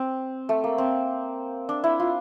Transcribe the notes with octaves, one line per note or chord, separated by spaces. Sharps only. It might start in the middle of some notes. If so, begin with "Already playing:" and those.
Already playing: C4
A3
A#3
C4
D4
E4
F4